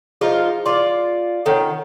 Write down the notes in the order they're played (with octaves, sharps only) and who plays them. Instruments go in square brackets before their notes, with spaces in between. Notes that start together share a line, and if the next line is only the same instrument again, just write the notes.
[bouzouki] F3 D#4 F4 [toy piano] G#4
[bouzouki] F4 D5 [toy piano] C6
[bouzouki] D#3 C#4 [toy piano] A4 C#5 F#5